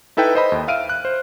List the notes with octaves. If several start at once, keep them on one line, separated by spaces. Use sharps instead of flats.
D#4 E4 A4 B4 G5
C5 D#5 B5
D#2
E5 F5 F6 D7 D#7
F#6
C5